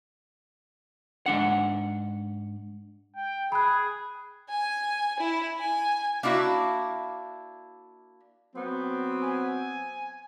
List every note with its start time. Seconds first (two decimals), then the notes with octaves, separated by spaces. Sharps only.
1.26 G#2 E3 D4 F#5
3.16 G5
3.52 G#4 B5 F#6
4.49 G#5
5.20 E4
5.59 G#5
6.23 A#3 D4 E4 F#4 E5
8.55 F#3 B3 C4
9.24 G#5